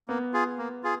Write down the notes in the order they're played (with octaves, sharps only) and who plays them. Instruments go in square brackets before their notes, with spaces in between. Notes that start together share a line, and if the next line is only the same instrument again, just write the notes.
[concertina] A#3 [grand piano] B3
[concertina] F4 G#4
A#3
F4 G#4